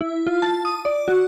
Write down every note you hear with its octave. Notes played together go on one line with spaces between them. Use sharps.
E4
F4
A5
D#6
D5
F#4